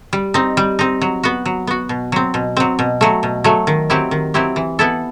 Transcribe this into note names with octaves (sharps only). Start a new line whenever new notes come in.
G3
C4 D#4
G3
C4 D#4
F#3
B3 F#4
F#3
B3 F#4
B2
F#3 C4
B2
F#3 C4
B2
F#3 A3
B2
F#3 A3
D#3
F#3 C4 E4 G4
D#3
F#3 C4 E4 G4
E3
B3 E4 A4